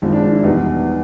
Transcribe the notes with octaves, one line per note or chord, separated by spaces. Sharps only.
G#1 G#2 F3 G#3 F4
D4
D4
E4
E2 B2 G3 D#4